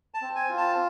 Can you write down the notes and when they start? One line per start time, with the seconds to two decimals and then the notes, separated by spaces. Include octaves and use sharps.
0.14 A5
0.22 C4
0.36 G#5
0.49 F4
0.57 A5